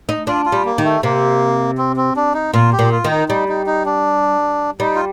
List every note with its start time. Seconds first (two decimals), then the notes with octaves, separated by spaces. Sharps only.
0.09 D#4
0.27 D4 F4
0.46 F4
0.52 G3
0.65 A#3
0.78 D#3
0.84 A3
1.03 C3 A#3
1.78 C4
1.96 C4
2.16 D4
2.34 D#4
2.53 A#2 F4
2.73 G4
2.79 A#2
2.91 F4
3.04 D#3
3.10 D#4
3.29 G3 D#4
3.48 D#4
3.66 D#4
3.86 D4
4.80 G3 D#4
4.95 F4